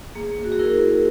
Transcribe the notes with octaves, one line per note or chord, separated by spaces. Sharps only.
A#3 G#4
F#4
G#4
E4 A#4